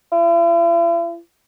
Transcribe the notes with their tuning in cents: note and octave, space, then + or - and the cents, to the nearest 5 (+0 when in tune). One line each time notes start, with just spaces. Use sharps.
E4 +45